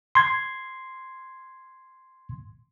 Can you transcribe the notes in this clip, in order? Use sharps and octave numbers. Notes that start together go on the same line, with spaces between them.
C6 G#6